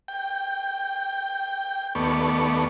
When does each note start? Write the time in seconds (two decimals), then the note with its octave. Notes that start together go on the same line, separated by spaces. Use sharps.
0.08 G5
1.95 D#2 A3 B3 D5 C#6